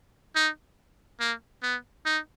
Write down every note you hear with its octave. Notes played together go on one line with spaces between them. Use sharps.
D#4
A#3
B3
D#4